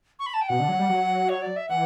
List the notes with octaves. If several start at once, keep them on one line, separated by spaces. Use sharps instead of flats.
C#6
B5
A5
G5
B2 F#5
D3
F#3
G3
F#3
C#5
D5
E5
E3 F#5